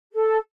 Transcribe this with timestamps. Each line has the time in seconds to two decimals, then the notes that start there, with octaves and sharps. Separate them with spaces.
0.13 A4